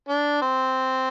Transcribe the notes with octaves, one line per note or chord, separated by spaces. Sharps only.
D4
C4